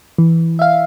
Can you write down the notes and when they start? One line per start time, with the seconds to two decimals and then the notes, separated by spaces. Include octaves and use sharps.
0.18 E3
0.59 E5 F5